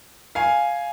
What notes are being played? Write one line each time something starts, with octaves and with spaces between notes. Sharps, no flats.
F5 G#5